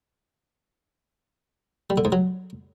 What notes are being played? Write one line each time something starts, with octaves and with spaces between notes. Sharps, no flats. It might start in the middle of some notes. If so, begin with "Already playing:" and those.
G3
D3
G#2
F#3